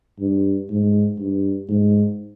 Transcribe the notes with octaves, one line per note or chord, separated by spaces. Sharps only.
G2
G#2
G2
G#2